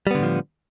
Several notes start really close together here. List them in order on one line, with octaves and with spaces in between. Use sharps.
G3 B3 D3 A2 F3